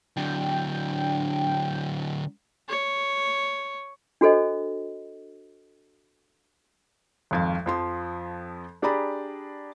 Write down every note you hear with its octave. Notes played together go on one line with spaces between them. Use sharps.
D3 F#3 D4 G5
C#5
D4 F#4 A4 C5 D#5
G#1 F2 F5
F2 F3 C6
D4 G4 G#4 D5 A#5 B5